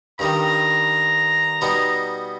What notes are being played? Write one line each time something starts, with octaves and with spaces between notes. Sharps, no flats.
G2 D#3 G3 A#5
B2 G3 B3 D#4